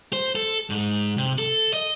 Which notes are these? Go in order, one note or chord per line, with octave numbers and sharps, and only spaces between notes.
C5
A4
G#2
C3
A4
D#5